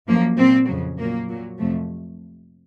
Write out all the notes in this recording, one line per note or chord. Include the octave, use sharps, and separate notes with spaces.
F#2 F3 A#3
A#2 F3 C4
F2 C#3 F#3
A#2 F#3 A#3
A#2 F#3
F2 C3 F3 A3